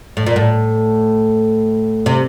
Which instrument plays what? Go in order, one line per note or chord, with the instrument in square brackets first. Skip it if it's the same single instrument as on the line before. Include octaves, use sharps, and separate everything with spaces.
[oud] A2
A#2
A2
C3